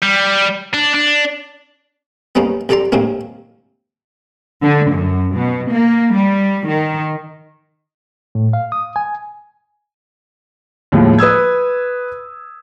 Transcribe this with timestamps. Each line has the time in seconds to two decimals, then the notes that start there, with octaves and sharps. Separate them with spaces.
0.03 G3
0.74 D4
0.94 D4
2.35 G3 G#3 A#3 B3 C#4 D#4
2.69 C2 G3 A4 D5 A#5 C6
2.92 D2 A2 C3 G#3 A#3 C4
4.62 D3
4.91 F#2
5.34 B2
5.69 A#3
6.13 G3
6.67 D#3
8.35 A2
8.53 F5
8.72 D#6
8.96 G#5
10.92 D#2 A2 F3 G#3
11.18 B4 D#6 E6 G#6